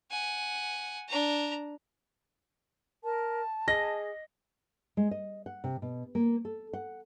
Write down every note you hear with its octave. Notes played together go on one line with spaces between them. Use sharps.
F#5 G#5
D4 A#5
A#4 A5
G#4 D#5 A#6
G#3
D#5
F#5
C3
B2
A#3
A4
F#5